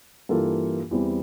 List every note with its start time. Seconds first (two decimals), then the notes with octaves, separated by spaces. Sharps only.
0.29 G2 E3 A#3 F4 A4
0.91 E2 E3 G3 C4